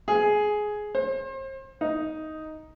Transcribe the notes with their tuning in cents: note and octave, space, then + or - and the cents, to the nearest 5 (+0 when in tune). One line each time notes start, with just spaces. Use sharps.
G#4 +10
C5 +40
D#4 +5